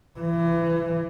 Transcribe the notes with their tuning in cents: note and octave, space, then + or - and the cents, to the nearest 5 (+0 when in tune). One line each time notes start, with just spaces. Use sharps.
E3 +30